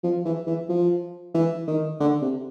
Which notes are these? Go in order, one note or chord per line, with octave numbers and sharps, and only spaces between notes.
F3
E3
E3
F3
E3
D#3
D3
C3